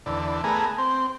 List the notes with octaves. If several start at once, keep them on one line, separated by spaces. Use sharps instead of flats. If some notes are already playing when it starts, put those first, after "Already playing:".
E2 D3
A3 B3 G#4 A#4
C4